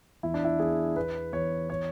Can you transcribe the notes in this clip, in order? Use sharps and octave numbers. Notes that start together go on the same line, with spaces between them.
E2 E4
D4
E4
E2 G#4
E2 B4
E2 C#5
C#5